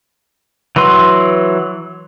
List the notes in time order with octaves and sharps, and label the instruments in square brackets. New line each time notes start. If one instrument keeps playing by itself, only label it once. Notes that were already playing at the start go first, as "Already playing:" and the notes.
[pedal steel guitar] E3 F#3 B4 C6